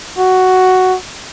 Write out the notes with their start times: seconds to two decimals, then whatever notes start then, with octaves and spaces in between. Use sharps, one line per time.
0.18 F#4